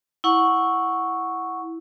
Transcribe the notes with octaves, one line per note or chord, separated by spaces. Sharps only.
E4 F#5 C#6